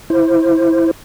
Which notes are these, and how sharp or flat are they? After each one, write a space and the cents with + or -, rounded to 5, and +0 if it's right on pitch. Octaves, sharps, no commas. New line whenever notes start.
E4 +0 C5 +0